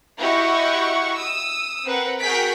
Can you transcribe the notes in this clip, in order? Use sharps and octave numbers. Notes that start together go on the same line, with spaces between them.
E4 F#4 G4 D#5 F#5 C#6
D#6 E6
C4 A#4 B4 F#5
F#4 G#4 A#4 G5 B6 D7